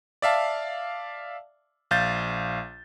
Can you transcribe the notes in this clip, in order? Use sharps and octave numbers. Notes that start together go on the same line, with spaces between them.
D5 E5 F5 A5
A#1 F5 G6 A6